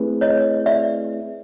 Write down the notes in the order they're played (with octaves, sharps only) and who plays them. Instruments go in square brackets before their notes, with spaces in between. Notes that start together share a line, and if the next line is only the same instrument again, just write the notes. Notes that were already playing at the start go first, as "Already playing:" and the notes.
Already playing: [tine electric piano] A3 C4 E4 G#4 B4
[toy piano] C#5 D#5
D5 E5